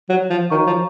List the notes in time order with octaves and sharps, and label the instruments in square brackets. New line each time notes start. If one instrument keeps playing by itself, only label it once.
[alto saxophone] F#3
F3
[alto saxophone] D#3 [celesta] F#4 C#5 F5 A#5 C#6
[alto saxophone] F3